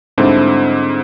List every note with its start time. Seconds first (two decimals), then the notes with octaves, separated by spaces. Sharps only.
0.18 G#2 D3 G3 C4 E4 A4